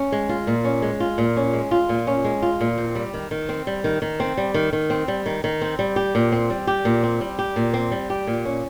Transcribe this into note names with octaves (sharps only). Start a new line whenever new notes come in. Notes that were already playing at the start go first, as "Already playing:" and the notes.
Already playing: C#4
G#3
F4
A#2
C#4
G#3
F4
A#2
C#4
G#3
F4
A#2
C#4
G#3
F4
A#2
C4
G3
D#3
D#3
C4
G3
D#3
D#3
C4
G3
D#3
D#3
C4
G3
D#3
D#3
C4
G3
G4
A#2
C4
G3
G4
A#2
C4
G3
G4
A#2
C4
G3
G4
A#2
C#4